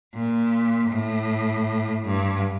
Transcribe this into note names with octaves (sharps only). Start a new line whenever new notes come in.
A#2
A2
G2